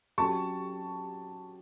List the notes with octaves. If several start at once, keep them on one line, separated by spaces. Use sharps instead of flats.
F#3 C#4 G4 A5 C#6